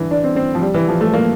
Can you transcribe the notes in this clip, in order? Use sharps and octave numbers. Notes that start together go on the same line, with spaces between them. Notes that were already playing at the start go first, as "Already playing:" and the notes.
Already playing: D3 E3
D4
C4
C4
F3
G3
E3
F3
A3
A#3